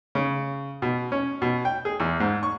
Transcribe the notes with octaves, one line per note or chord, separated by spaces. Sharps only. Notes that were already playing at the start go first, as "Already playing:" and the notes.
C#3
B2
C#4
B2
G5
G#4
E2
G#2
C#6